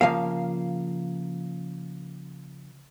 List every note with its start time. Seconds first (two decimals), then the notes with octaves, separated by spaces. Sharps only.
0.01 C#3 F3 A#3 F5